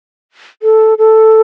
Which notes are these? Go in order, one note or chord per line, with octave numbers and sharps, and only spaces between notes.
A4
A4